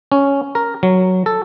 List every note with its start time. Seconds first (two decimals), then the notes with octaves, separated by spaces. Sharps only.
0.12 C#4
0.55 A#4
0.83 F#3
1.26 A4